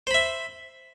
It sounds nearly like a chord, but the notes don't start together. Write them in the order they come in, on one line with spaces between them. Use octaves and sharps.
C5 B5 E5